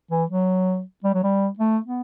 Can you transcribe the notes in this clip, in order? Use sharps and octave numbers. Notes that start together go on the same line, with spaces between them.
E3
F#3
G3
F#3
G3
A3
B3